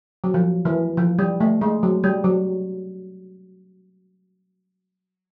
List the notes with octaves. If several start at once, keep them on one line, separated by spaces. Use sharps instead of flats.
F#3
F3
E3
F3
G3
A3
G#3
F#3
G3
F#3